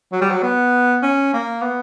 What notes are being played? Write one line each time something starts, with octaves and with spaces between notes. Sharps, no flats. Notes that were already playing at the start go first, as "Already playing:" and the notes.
F#3
G3
F#3
B3
C#4
A#3
B3